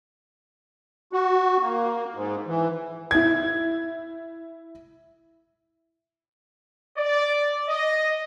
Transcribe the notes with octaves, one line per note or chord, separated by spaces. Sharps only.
F#4
A#3
G#2
E3
E4 G#6
D5
D#5